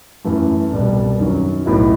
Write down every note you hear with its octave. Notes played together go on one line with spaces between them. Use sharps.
F#2 E3 A3
C2 B2 G3
F#2 D#3 F#3
B1 A2 F#3 B3 E4